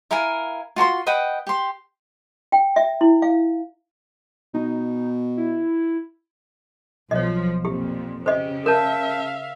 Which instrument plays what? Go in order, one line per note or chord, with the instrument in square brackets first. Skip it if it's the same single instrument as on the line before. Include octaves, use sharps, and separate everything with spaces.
[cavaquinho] E4 A#4 F5 G#5
F4 F#4 A5 C6
B4 D#5 F#5 G5
G4 C6
[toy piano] G5
E5
E4
F5
[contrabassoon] B2 [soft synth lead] D#4
[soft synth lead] E4
[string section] B1 F3 [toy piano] C#5 D#5
[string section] F2 A#2 [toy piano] G4
[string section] C#3 [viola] G4 [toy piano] C5 D#5
[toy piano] A#4 [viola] E5 F5 [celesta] A5 G6 E7